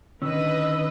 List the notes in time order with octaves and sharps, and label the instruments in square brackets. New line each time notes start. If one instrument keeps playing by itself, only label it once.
[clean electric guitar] D3 D#3 C#4 [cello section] B4 D#5 [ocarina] E6